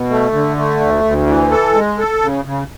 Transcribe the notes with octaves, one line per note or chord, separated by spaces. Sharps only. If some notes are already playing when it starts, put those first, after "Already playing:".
Already playing: B2
A3
D3
A3
D2
D2
E3
A4
G#3
A4
C#3
C#3